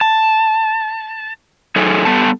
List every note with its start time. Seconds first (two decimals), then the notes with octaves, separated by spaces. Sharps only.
0.01 A5
1.76 F#3 A3 D#4 G#4 A4
2.05 G3 B3 A4 A5